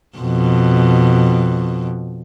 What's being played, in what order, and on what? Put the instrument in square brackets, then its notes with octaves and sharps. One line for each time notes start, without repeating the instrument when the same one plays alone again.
[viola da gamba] F2 B2